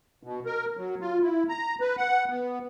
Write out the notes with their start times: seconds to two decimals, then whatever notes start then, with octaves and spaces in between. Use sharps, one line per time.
0.23 B2
0.46 A#4
0.77 F#3
1.01 F4
1.22 E4
1.49 A#5
1.81 B4
1.97 F#5
2.30 B3